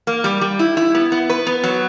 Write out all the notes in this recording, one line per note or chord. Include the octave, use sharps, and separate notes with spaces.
A#3
G3
G3
E4
E4
B3
B3
B4
B3
F#3